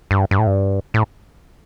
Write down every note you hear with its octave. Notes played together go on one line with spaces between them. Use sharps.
G2
G2
A2
G2
A2